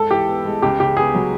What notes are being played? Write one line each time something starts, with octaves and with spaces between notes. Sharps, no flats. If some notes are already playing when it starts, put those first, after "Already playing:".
Already playing: G#2 A4
E3 G4
B3
G#3
C#2 G4
C#3 G4
B3 G#4
F#3